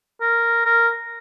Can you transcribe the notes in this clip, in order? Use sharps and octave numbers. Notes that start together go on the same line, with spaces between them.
A#4
A#4